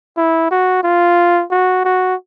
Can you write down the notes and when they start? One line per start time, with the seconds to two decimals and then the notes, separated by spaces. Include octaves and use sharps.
0.17 E4
0.51 F#4
0.83 F4
1.51 F#4
1.85 F#4